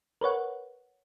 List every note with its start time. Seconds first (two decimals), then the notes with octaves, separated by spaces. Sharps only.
0.21 A#4 B4 C#5 F#5